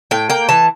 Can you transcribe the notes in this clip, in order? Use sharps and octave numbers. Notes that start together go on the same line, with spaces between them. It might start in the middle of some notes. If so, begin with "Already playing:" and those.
A2 G5
A#3 G5
E3 A5